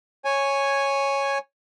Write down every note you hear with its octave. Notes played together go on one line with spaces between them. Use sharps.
C#5 G#5